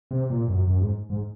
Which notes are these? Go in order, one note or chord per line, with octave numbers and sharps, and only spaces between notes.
C3
A#2
F#2
F#2
G#2
G#2